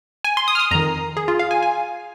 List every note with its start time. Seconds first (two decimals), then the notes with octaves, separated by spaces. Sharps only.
0.25 G#5
0.37 C6
0.48 D#6
0.55 F6
0.59 D#6
0.71 F2 D#3 A#5
1.17 G#4
1.28 F4
1.39 F5
1.51 G#5
1.63 G#5